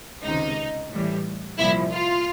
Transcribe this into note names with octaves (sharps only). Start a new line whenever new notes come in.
C#2 C3 D#3 D#4
A2 E3 G3
C2 A#2 F3 E4
F4